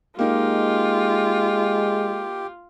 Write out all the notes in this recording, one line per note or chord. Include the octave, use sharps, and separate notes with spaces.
G#3 A#3 D#4 F4 G4